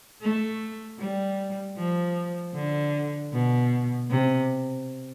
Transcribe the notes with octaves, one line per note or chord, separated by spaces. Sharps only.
A3
G3
F3
D3
B2
C3